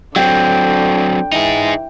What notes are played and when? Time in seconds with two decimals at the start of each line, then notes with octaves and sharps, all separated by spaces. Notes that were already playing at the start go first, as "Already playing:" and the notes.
0.16 D3 F#3 C4 G5
1.32 E3 D#4 G#4